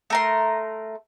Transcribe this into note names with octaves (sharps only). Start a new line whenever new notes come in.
A3 A#4 C6